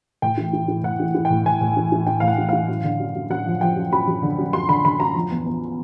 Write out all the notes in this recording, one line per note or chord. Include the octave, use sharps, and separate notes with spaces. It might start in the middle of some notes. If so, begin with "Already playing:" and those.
A2 G5
E3
E3
E3
A2 F#5
E3
E3
G5
A2
A2 G#5
A2
E3
E3
E3 G5
A2 F5
F#5
E3
E3 F5
F#2
D3
F#2
F#2
F#2 F#5
F3
F3 G5
F#2
F#2 B5
F#2
D3
F#2
F#2 C6
D3 B5
D3 B5
F#2 A#5
F3
E2
E2